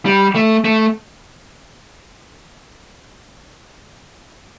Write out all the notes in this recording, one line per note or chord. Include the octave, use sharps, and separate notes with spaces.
G3
A3
A3